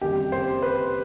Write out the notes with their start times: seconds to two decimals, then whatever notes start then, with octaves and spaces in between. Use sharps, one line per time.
0.01 F#1 F2 C3 D#3 G3 G4
0.32 C5
0.62 B4